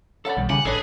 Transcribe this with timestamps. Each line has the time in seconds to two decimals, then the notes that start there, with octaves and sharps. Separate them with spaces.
0.25 C#4 A4 D5 F#5 B5
0.37 B1 D#3 G3
0.49 C#3 G4 F#5 G#5 B5
0.65 A1 C#4 D4 G#4 A4 B4 D#5